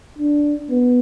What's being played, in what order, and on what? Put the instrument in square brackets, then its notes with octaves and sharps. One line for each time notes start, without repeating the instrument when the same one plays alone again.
[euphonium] D4
B3